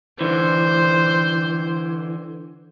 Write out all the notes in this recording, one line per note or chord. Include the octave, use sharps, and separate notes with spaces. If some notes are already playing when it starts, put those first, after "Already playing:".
D3 E3 C5